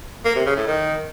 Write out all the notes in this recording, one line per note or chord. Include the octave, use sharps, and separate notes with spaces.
A#3
C3
C#3
A2
D#3